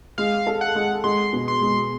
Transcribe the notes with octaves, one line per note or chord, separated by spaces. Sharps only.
G#3 F5
A4
F#5
G#3
G#3 C6
B2
C6
G#3